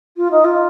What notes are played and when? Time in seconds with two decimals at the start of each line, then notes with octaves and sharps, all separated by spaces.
0.17 F4
0.31 D#4
0.44 F4